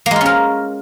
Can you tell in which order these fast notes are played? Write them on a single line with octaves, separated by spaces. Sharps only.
A#3 G#3 F4 C#4 A#4